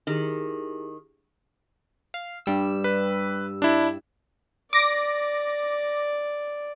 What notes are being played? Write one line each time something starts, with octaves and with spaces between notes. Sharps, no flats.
D#3 E4 G4 G#4
F5
G2 G3 E6
B4
D4 E4
D5 D6 A#6